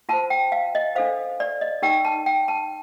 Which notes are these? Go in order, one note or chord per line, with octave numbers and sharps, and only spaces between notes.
F4 C5 A5
G5
F5
D#5
D4 A4 C5 F5
D5
D#5
D#4 G4 A#4 G5
A5
G5
A5